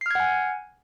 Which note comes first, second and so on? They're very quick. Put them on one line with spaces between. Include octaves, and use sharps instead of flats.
C7 F6 G#6 F#5 G#5